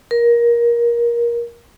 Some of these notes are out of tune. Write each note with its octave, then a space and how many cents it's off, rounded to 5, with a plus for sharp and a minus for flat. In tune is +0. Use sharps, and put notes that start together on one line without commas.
A#4 +20